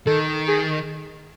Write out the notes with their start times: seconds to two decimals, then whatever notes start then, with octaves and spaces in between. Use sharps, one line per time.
0.07 D#3 A4
0.48 G#4